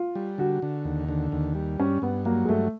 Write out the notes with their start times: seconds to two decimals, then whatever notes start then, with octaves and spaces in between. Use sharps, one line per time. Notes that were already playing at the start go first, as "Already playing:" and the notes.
Already playing: F4
0.15 G3
0.38 D3 F#4
0.62 D3
0.85 D#2
1.09 D3
1.32 D#2
1.55 G3
1.80 G2 C#4
2.02 G2 B3
2.25 F#3 A#3
2.45 G#3
2.49 G2 A3